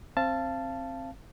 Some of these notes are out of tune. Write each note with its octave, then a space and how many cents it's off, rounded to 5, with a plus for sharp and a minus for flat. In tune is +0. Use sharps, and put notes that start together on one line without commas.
C4 +20 F5 -25 A5 +0